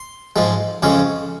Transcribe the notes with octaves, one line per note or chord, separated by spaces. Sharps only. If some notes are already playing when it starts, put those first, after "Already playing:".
Already playing: C6
G#2 F3 G#3
F2 C#3 G#3 C#4